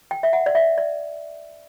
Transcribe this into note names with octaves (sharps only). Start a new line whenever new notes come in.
G5
E5
F#5
D5
E5
D5